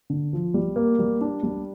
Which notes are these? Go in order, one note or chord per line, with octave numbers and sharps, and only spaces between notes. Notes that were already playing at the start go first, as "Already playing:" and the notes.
D3
F3
G3
A#3
G3
D4
G3